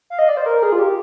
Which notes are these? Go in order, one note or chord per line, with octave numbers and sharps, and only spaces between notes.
F5
D#5
D5
C5
A#4
G#4
F4
G4